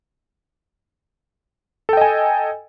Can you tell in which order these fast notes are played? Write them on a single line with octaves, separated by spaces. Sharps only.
A4 G5 D#5 G#5